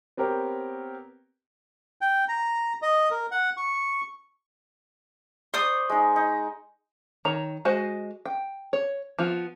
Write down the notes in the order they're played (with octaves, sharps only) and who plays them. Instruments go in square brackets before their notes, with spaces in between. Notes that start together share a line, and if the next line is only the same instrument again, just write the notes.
[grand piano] B3 C4 G4 A#4 C#5
[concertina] G5
A#5
D#5
A#4
F#5
C#6
[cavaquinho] C5 D#6 [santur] D5 C#6
[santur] G#3 D#4
D#4
[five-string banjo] D#3 C#5 A#5
G#3 F#4 C5 D#5 G#5
G5
C#5
F3 B3 F4